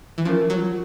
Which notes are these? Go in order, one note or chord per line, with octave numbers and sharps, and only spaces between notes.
E3
F3 C#4 F4 A#4
F#3